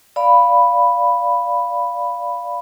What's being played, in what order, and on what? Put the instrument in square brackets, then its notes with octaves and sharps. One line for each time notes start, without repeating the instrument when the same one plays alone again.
[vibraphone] D5 F5 B5